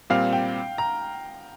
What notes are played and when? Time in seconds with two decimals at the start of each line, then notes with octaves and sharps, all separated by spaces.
0.10 A#2 G3 C4 F5
0.33 G5
0.78 A#5